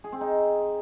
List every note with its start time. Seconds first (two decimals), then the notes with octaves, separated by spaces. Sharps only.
0.04 G#4
0.12 C4
0.21 D#4